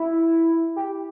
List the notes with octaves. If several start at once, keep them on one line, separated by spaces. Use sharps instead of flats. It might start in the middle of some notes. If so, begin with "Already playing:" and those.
Already playing: E4
G4